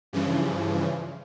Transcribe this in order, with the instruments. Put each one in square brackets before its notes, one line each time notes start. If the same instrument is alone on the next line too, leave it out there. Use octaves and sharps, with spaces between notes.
[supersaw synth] G2 C#3 E3 F3